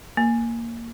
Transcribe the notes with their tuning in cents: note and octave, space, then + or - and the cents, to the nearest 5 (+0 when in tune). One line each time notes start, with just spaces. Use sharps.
A#3 -5